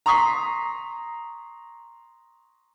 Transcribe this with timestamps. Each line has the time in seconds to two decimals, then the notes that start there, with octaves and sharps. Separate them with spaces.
0.06 A#5 C6 C#6 D#6 B6 C7